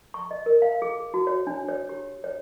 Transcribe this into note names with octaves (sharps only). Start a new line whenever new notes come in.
C#6
D#5
A#4
F5
G#4
F#4
C#5
D4
C#5
G4
C#5